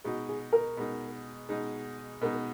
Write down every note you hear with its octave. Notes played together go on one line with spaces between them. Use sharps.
B2 G#3 D#4 F#4
G#4
A#4
B2 G#3 D#4
B2 G#3 D#4
B2 G#3 D#4 A#4